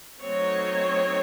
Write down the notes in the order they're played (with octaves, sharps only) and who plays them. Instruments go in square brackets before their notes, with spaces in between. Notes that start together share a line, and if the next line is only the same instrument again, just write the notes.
[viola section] F#3 A3 C4 D#4 C#5